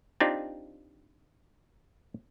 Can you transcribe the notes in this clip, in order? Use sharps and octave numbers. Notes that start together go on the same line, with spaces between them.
C4 D4 D#4 F4 G4